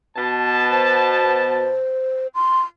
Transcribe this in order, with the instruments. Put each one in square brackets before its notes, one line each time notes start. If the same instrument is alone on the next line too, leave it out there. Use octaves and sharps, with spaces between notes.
[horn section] B2 A5
[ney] C5
C6